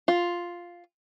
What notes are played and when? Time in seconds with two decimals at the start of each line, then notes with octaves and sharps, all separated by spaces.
0.08 F4